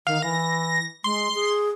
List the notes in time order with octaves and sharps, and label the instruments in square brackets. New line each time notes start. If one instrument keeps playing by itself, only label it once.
[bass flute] D#3 [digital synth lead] F5
[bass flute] E3 [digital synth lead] A#6
[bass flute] G#3 [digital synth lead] C6
[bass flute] G#4